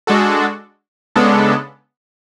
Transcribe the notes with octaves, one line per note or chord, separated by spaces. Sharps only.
G#3 D4 F#4 A4
C#3 G#3 B3 D4 A4